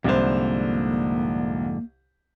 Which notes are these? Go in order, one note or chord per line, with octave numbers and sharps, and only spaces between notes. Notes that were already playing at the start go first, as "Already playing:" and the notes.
C2 F2 G#2 D3 A#3 C5